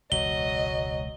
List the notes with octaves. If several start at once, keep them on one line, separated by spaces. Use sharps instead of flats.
E1 C#2 F#3 D#5 G7